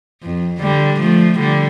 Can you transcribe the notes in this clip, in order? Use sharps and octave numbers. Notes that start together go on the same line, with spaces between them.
F2
D3 G3
F3 A3
D3 G3